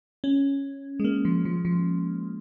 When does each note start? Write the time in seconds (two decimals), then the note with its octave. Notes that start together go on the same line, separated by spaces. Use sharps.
0.24 C#4
1.00 G#3
1.04 A#3
1.25 F3
1.45 F3
1.65 F3